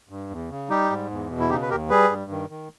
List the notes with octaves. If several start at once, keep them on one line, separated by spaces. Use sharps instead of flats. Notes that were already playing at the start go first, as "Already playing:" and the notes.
G2
E2
C#3
G3 D#4 G4
G#2
E2
B2
E4
C#3 D#4 G4
B4
D#2 G4 A#4
G3 G#4 B4
G2
D#3
D#3